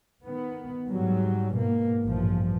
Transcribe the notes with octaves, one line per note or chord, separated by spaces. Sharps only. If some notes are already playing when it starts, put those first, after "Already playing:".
D#3 B3
G#2 F#3 G3
G#2 B2 A#3
A1 G2 A#2 F3